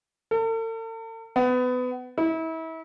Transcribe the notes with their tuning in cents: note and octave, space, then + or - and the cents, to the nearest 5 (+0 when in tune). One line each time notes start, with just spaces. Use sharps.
A4 +45
B3 +25
E4 -35